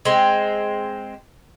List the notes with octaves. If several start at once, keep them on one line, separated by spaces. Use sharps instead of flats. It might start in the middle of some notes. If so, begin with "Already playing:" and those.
G#3 C4